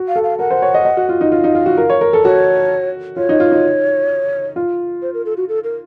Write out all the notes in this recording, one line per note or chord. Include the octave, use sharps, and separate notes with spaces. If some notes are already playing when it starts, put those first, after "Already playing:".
Already playing: F#4
F5
A4
F5
A#4 F#5
C5
C#5
D#5
D#5
F#4
F4
D#4
F4 F5
D#4
F4
F#4
A#4
C#5
A#4
A4
F#4 C#5
F4 C#5
D#4
F4
D#4
F4
C5
A#4
A4
F#4
A4
A#4